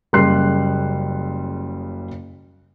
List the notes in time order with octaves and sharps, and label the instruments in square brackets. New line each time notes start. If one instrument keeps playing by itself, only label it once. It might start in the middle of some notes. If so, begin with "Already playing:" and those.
[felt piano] F#1 C#3 G3 C6 F#6 C7